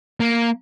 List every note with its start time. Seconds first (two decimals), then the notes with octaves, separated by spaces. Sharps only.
0.20 A#3